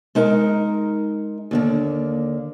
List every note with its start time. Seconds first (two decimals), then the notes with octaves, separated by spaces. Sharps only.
0.15 G#3 D#4 A#4 A5 A#5
1.51 D#2 D3 A#3